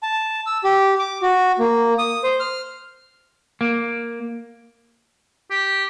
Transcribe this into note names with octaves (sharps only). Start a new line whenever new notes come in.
A5
E6
G4
D6
F#4
A#3
D#6
C5
F6
A#3
G4